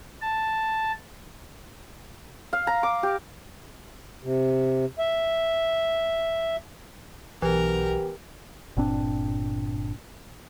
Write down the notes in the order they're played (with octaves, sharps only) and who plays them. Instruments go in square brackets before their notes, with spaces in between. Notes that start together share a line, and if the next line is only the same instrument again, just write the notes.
[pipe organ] A5
[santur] F5
A#5
D6
G4
[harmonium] C3
E5
[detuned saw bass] B1 [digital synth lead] E3 [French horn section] B3 G4 [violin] A#4
[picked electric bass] G1 A#2 C4 D4